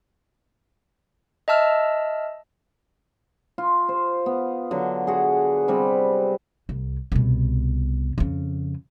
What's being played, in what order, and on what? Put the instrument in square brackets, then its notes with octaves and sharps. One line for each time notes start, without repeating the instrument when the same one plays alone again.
[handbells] D#5 E5 A5 E6 F6
[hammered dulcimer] F4
C5
B3
D3 F#3
F#4 G#4
C3 G3 B4
[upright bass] C2
C2 B2
F2 C#3